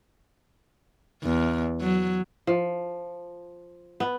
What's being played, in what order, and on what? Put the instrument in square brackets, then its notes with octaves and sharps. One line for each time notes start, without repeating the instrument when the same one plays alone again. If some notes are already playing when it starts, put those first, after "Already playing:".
[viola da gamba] E2
F#3
[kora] F3
B3